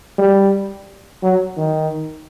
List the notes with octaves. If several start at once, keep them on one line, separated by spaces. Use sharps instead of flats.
G3
F#3
D#3